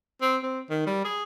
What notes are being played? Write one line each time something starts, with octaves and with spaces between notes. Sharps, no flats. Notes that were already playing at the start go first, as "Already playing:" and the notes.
C4
C4
D#3
G3
G#4